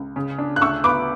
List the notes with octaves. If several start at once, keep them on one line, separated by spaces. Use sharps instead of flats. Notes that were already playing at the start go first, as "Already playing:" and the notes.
Already playing: C#2
C#3
D4
F#6
D2 C#6 E6
B3 B5 D6